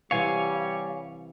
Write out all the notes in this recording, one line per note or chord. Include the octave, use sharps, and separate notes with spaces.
C3 E3 G3 C#5 F5 F#5 G#5